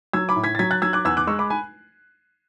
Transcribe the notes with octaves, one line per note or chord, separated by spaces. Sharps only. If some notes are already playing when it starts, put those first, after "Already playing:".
F#3 E6 G#6
B5 D6
A2
G#6 B6
A6
F#3 G#6 B6
F#6 A6
F#3 E6 G#6
D6 F#6
E2 E6 G#6
D6 F#6
G#3 C#6 E6
B5 D6
G#5 B5